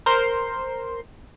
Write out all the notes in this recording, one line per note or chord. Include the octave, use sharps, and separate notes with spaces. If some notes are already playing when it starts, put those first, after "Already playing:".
A#4 C5 C6